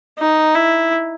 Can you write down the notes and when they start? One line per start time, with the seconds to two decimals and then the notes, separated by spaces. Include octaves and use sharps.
0.19 D#4
0.54 E4